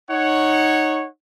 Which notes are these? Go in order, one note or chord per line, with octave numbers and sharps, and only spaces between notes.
D#4 C#5 F#5